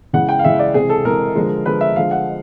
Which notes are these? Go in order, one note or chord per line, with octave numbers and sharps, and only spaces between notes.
C#3 E3 G#3 F#5
G5
F5
C#3 E3 G#3 E5
D5
C3 E3 G#3 G#4
A4
C3 E3 G#3 A#4
D3 F3 G#3
D3 F3 G#3 B4
E5
D3 F3 G#3 F5
F#5